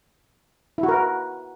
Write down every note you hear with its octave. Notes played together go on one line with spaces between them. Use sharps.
E4
F#4
A#4
B4